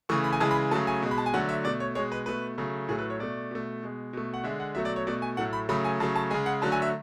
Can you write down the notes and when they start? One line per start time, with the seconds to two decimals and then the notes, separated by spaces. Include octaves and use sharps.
0.09 C#3 E3 A3 C#6
0.24 B5
0.32 G#5
0.40 C#3 E3 G#3 A5
0.51 B5
0.71 C#3 F#3 A3 A5
0.87 G#5
1.02 B2 G#3
1.11 B5
1.18 A5
1.26 G#5
1.34 D3 F#3 A3 F#5
1.49 E5
1.64 B2 A3 D5
1.80 C#5
1.95 B2 G#3 C#5
2.12 B4
2.26 B2 A3 B4
2.58 C#3 F#3 A3
2.88 A2 F#3 A3 G#4
2.99 B4
3.10 C#5
3.19 B2 A3 D5
3.51 B2 A3
3.83 B2 G#3
4.13 B2 A3
4.34 F#5
4.44 D3 G#3 E5
4.60 F#5
4.75 B2 F#3 A3 E5
4.85 D5
4.96 C#5
5.07 B2 A3 D5
5.22 G#5
5.37 A2 F#3 A3 F#5
5.53 B5
5.69 C#3 F#3 A3 B5
5.85 G#5
6.00 C#3 F#3 A3 A5
6.16 A5
6.31 C#3 G#3 G#5
6.46 F#5
6.62 D3 F#3 A3 A5
6.72 G#5
6.82 E5